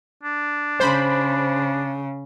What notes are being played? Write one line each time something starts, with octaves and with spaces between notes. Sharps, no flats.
D4
C#3 C5 B5